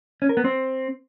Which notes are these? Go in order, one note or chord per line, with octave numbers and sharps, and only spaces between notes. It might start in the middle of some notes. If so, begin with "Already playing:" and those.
C#4
A#4
B3
C4